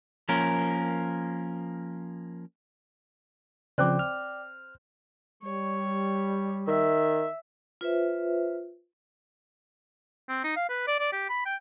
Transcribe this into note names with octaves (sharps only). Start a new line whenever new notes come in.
F3 A#3 C#4 A#4
C#3 F3 C4 D5 G5 D6 F#6
F6
G3 C#5
D#3 E5
F4 B4 C5 E5
C4
D#4
F5
B4
D5
D5
G4
B5
G5